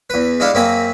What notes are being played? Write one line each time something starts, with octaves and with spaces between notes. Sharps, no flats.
E2 B4
G#3 D4 E4 A4 F5
F#2 A#3 C4 G#4 B5